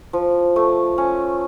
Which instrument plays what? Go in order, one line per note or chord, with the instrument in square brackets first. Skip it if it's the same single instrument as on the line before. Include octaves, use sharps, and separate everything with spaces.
[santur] F3
A3
C#4